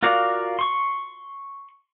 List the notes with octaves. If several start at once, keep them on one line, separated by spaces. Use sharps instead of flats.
F4 F#4 A#4 D5 F5
C6 C#6